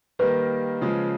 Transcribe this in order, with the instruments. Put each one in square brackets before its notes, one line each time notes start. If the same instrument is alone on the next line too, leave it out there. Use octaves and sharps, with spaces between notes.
[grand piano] D#3 G3 A#3 [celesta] B4
[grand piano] C#3 F3 G#3